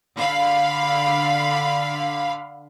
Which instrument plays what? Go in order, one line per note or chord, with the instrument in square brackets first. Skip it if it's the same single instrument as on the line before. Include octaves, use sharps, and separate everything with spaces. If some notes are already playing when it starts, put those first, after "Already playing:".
[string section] D3 F5 B5